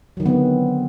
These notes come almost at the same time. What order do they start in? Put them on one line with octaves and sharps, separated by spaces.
F#3 D#3 D3 B3 C4